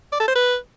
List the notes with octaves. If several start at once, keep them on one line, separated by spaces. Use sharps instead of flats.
D5
A4
C5
B4